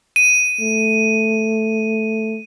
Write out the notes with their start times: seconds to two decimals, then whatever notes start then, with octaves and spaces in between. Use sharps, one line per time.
0.16 D#7
0.60 A3